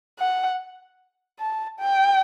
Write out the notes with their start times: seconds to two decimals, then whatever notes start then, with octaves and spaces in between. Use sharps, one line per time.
0.19 F#5
1.39 A5
1.79 G5